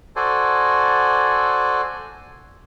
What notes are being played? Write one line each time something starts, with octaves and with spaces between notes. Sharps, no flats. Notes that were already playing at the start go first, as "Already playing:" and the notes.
F#4 A4 C5 D5 G#5